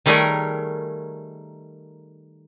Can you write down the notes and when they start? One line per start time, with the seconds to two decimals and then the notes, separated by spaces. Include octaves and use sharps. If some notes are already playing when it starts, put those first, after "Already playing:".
0.06 D#3 G3 A3 G#4 A#4 C#5